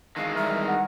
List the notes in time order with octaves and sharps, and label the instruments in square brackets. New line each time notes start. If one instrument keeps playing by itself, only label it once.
[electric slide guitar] D#3 E3 G#3 [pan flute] F5
[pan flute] G3 [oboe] A#4 [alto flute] E5
[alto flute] F#5